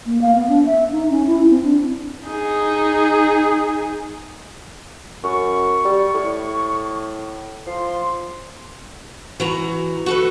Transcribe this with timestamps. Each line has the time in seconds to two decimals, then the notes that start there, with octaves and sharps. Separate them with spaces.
0.06 A#3
0.22 F5
0.35 B3
0.49 D4
0.66 E5
0.92 D#4
1.10 C#4
1.27 E4
1.50 C4
1.64 D4
2.27 D#4 G#4
5.24 F#2 C#6
5.85 G3
6.14 A2
7.66 F3 C6
9.40 E3 F#4 A#5
10.06 F#4 A4 B4